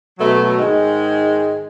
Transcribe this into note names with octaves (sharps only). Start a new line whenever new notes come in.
B2 F#3 A3
G#2 D#3 G#3